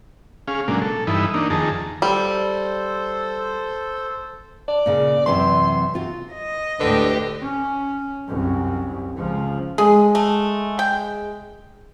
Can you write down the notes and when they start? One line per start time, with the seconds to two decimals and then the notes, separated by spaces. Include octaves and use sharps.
0.48 C#4 G#4 F5
0.68 A#2 F#3 G#3 A#3 D4
0.82 A4
1.07 G2 E3 D#4 E4 B5
1.34 A#3 D4 D#4
1.50 F2 D#3 G#4 A5 A#5
2.02 G3 A4 C5
4.68 D5
4.86 A#2 C#3
5.26 F#2 C3 E3 C6
5.94 C3 F4 F#4
6.33 D#5
6.80 D2 A2 D3 G4 B4
7.41 C#4
8.28 C2 F#2
9.16 C#2 F3
9.78 G#3 G#4
10.15 A3
10.79 G5